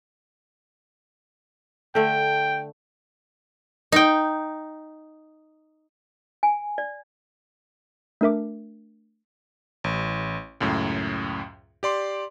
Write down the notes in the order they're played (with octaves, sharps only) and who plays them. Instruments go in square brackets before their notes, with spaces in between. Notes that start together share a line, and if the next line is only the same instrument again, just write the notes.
[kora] D3 A3 [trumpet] G5
[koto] D#4 G5
[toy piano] G#5
D5
[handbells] A3 D4 A#4 E5 D6
[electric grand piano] A1
C#2 F#2 A2
G4 D5 C6 D6